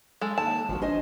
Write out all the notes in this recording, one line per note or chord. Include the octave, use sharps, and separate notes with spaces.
G#3 A4
D#2 A5
G#1 F3 F#4
D4 C5 D#5 G#5